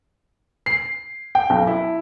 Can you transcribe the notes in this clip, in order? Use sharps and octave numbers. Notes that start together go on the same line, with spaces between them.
C7
G5
B1
E4